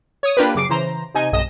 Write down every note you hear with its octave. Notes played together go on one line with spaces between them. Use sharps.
C#5 D#6
A#3 D4 F4 G4 A#4 B4
F#2 C#3 D6 C7 D7
C#3 E3 C5 A#5
C3 D#4 G#5 D#7
B1 G2 D#5 A#6 E7